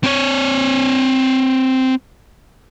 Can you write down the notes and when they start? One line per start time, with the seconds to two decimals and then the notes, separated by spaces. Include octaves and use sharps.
0.04 C4 C#5